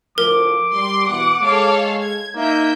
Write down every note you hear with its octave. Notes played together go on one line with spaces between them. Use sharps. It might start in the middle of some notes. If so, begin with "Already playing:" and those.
D2 A2 F3 A#4 D6
G3 C6
B2 E3 B3 F#5
G#3 A4 C#5 F5
G#6
A#3 D#4 E5 G6